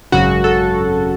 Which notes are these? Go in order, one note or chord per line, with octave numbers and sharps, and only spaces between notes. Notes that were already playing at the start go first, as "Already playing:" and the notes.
G#1 F#2 C#3 F#3 F#4
A4